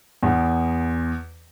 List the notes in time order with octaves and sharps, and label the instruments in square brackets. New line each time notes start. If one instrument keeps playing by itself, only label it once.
[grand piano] E2